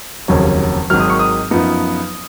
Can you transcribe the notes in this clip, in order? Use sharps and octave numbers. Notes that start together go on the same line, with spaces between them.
F1 D#2 C#3 F#3 C#4
G#1 G#2 D#3 F#3 F6
D#6
C#6
D#6
F#2 F3 B3 D#4